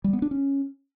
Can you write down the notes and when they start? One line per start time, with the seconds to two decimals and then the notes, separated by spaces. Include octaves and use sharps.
0.04 G3
0.13 B3
0.22 D4
0.31 C#4